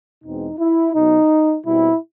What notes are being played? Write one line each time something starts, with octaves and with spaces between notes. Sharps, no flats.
E2 B2 G#3 C4 D#4
E4
B2 F#3 B3 D#4
B2 G3 C4 E4